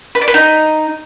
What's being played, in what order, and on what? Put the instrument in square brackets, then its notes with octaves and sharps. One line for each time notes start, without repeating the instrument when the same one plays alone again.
[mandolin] B4
D5
B4
D#4